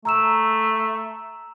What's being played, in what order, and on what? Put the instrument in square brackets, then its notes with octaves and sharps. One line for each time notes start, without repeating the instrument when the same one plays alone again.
[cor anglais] A3 [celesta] A#5 E6 E7